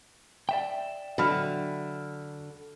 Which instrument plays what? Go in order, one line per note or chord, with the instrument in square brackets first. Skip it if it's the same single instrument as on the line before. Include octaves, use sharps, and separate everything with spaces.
[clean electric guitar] D5 E5 G5
[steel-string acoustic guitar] D3 [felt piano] F#3 B5 F6